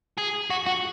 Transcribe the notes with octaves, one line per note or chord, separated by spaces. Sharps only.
G#4
F#4
F#4